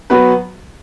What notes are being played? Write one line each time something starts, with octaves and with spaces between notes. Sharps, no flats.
F#3 B3 F#4 B4